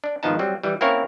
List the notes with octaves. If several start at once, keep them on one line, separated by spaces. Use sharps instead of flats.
D4
G#1 D#3 F3 B3 D#4 A5
F#3 G3 C4
E3 G3
A#3 C4 C#4 E4 A#4 C#5